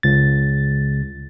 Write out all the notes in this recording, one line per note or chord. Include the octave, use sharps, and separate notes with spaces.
C#2 A6